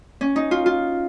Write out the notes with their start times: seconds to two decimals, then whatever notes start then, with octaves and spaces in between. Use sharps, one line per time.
0.21 C#4
0.36 D#4
0.51 F4
0.66 F4